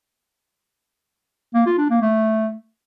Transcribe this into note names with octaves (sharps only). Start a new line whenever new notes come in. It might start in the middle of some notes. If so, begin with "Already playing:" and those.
A#3
F4
D4
A#3
A3